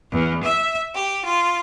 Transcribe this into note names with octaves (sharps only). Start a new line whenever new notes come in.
E2
E5
G4
F4